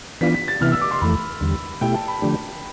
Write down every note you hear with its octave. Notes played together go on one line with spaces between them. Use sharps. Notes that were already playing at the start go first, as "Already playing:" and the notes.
E3 B3 D4 F4 B6
B6
A6
C3 E3 B3 E4 F6
E6
D6
C6
F2 E3 A3 B5
E2 D3 G3
B2 A3 E4 G4 G5
A5
B5
D3 F3 A3 D4 G4